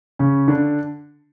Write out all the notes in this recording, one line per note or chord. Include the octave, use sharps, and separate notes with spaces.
C#3 C#4
D3 D4